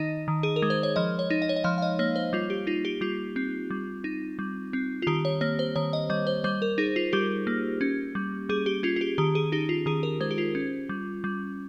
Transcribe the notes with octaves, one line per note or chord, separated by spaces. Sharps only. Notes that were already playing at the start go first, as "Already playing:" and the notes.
Already playing: D#3 D#4 D#5
D#3
G#4
A#4
G#3
C5
C#5
F3 D#5
C#5
D#4
D#5
C#5
D#5
F3 F5
F5
D#5
A#3 C#5
C5
G3 F4
G4
D#4 F4
G4
G3 F4
C4
G3
D#4
G3
C4
F4
D#3 G4
C#5
A#3 C#5
C5
D#3 C#5
D#5
G3 D#5
C5
G3 C5
A#4
D#4 G#4
F4
G3 G4
A#3
C#4
G3
G3 G#4
G4
C#4 F4
F4
G4
D#3 G4
G#4
D#4 G4
F4
D#3 G#4
A#4
G#3 C5
G4
F4
C#4
G3
G3